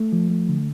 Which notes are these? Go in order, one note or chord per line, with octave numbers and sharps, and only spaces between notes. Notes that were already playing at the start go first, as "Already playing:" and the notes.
Already playing: A3
F3
A3
D3